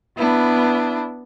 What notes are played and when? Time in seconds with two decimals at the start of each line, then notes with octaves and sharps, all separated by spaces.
0.18 B3 D4 E4